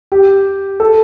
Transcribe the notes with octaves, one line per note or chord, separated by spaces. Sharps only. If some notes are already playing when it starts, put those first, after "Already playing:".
G4
A4